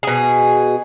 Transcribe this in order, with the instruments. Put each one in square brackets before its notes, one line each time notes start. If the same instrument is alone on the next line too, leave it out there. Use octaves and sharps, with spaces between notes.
[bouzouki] B2 G#4